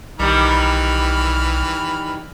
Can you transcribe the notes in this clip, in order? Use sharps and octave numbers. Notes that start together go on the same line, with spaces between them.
B1 D#3 E3 G3 B5 F6